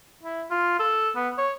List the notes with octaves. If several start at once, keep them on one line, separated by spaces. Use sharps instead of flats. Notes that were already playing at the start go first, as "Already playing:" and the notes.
E4
F4
A4
B3
C#5